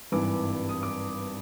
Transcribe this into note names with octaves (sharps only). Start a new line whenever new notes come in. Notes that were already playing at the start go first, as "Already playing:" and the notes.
G#1 G2 E3 D6
D#6
D6